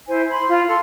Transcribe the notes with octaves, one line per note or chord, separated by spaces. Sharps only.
E4 C5 G#5
B5 C6
F4
A4 C6